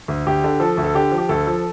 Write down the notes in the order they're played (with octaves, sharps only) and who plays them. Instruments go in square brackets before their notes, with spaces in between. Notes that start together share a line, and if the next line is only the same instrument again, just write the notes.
[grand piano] D2
D2 G4
D3
F3 A4
D2
A4
D3 G4
F3
G4
D2 A4
F3